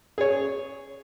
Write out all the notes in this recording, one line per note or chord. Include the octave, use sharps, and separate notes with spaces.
G#4 C#5